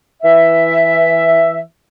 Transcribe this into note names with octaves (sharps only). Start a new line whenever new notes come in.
E3 E5